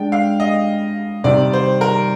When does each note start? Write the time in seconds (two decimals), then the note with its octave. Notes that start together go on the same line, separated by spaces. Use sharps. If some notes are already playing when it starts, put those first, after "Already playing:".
Already playing: G#3 D4 G5
0.12 F5
0.40 D#5
1.24 C3 D#3 G3 D5
1.53 C5
1.81 A#4